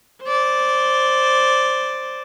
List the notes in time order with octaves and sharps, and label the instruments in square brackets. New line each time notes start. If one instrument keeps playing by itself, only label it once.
[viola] C5 D5